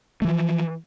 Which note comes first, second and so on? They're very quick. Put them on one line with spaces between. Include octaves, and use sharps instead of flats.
A3 E3 F3